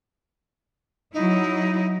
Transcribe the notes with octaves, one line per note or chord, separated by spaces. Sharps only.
F#3 D#4 E4